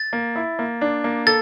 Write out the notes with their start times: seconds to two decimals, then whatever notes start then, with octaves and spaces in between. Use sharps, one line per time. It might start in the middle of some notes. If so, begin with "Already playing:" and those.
Already playing: A6
0.13 A#3
0.36 E4
0.59 A#3
0.81 D4
1.04 A#3
1.27 A4 A6